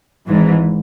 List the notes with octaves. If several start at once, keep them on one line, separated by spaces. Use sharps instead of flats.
G#1 G#2 E3